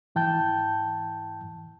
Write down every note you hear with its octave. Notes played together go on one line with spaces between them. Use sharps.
G#2 E3 G5 A5 G6